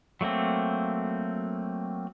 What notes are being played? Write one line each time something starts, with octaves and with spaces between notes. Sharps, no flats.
F#3 A3 A#3 C4